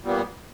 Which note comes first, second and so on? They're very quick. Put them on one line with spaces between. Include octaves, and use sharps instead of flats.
A#2 G3 B3 A#3